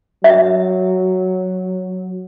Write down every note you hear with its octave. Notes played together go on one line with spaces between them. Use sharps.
F#3 E5